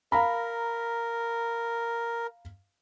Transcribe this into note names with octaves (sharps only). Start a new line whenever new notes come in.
A#4 F5 A#5 B5